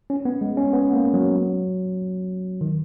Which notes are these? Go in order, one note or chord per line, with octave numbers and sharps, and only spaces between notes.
C#4
B3
G#3
C#4
B3
A#3
F#3
D#3